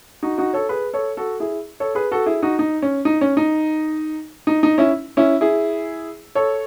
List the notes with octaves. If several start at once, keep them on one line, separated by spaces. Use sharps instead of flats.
D#4 F#4
D#4 F#4
A4 C#5
G#4 B4
A4 C#5
F#4 A4
E4 G#4
A4 C#5
G#4 B4
F#4 A4
E4 G#4
D#4 F#4
D#4
C#4
D#4
C#4
D#4
D#4
D#4
C#4 E4
C#4 E4
E4 G#4
A4 C#5